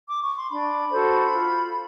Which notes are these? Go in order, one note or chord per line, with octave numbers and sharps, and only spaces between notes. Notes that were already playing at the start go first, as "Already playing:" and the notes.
D6
C#6
C6
D4 B5
F#4 A4 C5
F4